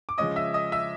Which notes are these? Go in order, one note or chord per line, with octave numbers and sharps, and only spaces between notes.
D6
C#3 F3 G#3 C#4 D#5 D#6
E5 E6
D#5 D#6
E5 E6